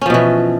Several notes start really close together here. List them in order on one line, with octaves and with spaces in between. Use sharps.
C#4 F3 B2 E3